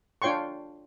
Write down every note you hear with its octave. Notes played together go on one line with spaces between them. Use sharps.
D4 F4 C#5 G5 C6 C#6